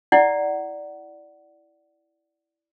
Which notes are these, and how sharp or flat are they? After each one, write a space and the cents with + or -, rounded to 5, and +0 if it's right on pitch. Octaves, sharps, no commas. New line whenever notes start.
E4 +0 D5 +0 F#5 +15